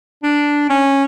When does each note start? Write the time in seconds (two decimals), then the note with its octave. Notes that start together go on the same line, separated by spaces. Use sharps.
0.23 D4
0.70 C#4